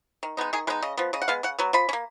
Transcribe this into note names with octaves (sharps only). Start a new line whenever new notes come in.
D#3
G#3 B3 D#4
D#3 G#4
G#3 B3 D#4 B4
C#3 D#5
F3 B3
C#3 D#5
F#5
G#3 B3 F5
C#3 F#5
F#3 B3
F3 B5
C#4
A#3